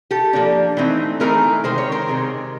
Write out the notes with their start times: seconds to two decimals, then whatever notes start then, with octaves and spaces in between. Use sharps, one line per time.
0.11 G4 A4
0.33 F3 A#3 D4
0.77 E3 A3 C4 D#4
1.20 E3 A3 C4 D#4 G#4 A#4
1.64 C3 D#3 G#3 C5
1.78 C#5
1.92 A#4 C5
2.08 C3 D#3 G#3